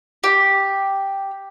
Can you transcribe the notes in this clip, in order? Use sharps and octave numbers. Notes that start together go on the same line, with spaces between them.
G4